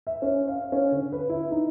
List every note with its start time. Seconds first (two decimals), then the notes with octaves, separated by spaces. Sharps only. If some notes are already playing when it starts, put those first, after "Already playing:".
0.07 E5
0.22 C#4
0.48 F5
0.72 C#4
0.92 D3
1.12 B4
1.29 E4
1.51 D#4